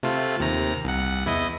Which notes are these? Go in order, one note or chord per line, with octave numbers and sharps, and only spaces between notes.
C3 A3 F4
D#2 C3 A#5
C2 F#5
E2 E4 D#5